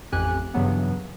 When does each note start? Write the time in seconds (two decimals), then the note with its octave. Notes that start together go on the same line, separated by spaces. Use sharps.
0.12 A1 F2 G4 G#5 F#6
0.54 G2 C#3 E3 F#3 B3